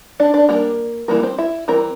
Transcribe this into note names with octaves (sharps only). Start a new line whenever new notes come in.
D4 D5
D4 D5
G3 A#3 D4 A#4
E3 G3 A#3 A#4
C4 C5
E4 E5
E3 G3 C4 A#4 A#5